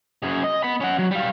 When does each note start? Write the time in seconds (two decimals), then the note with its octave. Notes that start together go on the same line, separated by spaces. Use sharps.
0.22 F#2 G#4
0.44 D#5
0.63 B3 B5
0.80 C#4 F#5
0.98 F#3
1.11 G3 F5